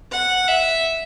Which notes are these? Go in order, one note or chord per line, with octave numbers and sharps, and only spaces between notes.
F#5
E5